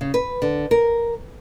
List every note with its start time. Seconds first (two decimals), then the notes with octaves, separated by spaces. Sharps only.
0.01 C#3
0.14 B4
0.42 D3
0.71 A#4